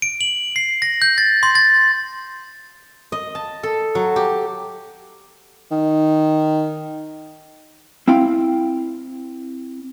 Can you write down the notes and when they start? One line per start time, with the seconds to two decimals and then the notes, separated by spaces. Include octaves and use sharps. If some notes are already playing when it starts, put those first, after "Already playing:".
0.02 D7
0.21 F#7
0.56 C7
0.82 A#6
1.02 G6
1.18 A6
1.43 C6
1.55 A6
3.12 D#5
3.35 A5
3.63 A4
3.95 F#3
4.16 G4
5.71 D#3
8.08 C4 E4 F5 G5